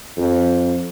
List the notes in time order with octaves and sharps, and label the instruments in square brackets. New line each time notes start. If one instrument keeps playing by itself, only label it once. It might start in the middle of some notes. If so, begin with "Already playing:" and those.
[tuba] F2